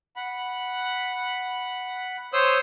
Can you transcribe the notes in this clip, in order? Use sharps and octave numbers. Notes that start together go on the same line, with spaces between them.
F#5 B5
C5 C#5 C6 D#6 E6